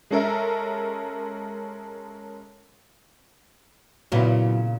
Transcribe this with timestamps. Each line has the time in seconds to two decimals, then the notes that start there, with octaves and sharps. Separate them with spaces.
0.10 G#3 C#4 A4 A#4 E5
4.12 A#2 C#3 F#3 B3 E4